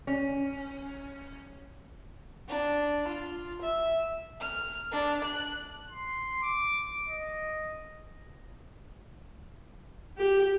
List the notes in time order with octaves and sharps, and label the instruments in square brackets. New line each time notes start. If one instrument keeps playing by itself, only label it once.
[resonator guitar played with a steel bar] C#4
[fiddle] D4
F4
E5
[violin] F6
D4
F#6
[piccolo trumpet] C6
D6
D#5
[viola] G4